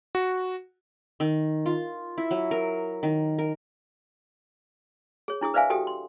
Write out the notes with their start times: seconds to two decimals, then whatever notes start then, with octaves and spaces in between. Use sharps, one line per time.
0.15 F#4
1.20 D#3
1.66 F4
2.18 E4
2.31 F#3
2.51 A#4
3.03 D#3
3.39 A#4
5.28 G#4 C#5
5.41 D4 E4 G#4 D#6
5.54 B4 C5 D5 E5 F5 G#5
5.70 F#4 G4 A4 G5 D#6
5.87 C6